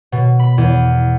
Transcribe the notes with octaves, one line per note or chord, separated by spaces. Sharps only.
B2
B5
E2